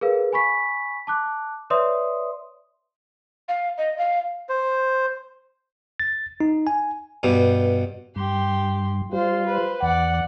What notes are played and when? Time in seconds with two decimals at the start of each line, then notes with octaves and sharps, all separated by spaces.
0.01 G#4 A#4 B4 F5
0.33 G#5 B5 C#6 B6
1.07 A5 D6 F#6
1.70 B4 C#5 D5 E5 C6 D#6
3.48 F5
3.78 D#5
3.98 F5
4.49 C5
6.00 A6
6.41 D#4
6.67 G#5
7.23 G2 B2 G3
8.16 G2 G4 C6
9.13 G3 F4 C5
9.46 B4 C5
9.82 E2 D5 F#5